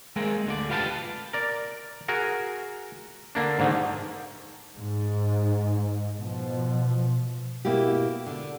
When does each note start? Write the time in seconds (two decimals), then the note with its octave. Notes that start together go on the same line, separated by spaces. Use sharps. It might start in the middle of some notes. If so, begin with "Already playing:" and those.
0.16 G#3 A#3 C4 G#4 A#4
0.47 D2 D3 D5
0.70 F4 G4 B4 F5 G5 A5
1.33 A#4 D5
2.08 F#4 G#4 A#4
3.35 D3 A#3 D4
3.59 G#2 D3 D#3
4.75 G#2
6.19 B2 F3
7.65 B2 A#3 E4 F#4 G4
8.27 D3